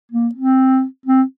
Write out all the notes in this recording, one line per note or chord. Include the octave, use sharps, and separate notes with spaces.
A#3
C4
C4